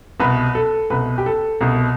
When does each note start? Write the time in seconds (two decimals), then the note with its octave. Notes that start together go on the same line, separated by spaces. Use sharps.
0.20 C2 B2 B4
0.55 A4
0.90 C2 B2 B4
1.18 G4
1.26 A4
1.61 C2 B2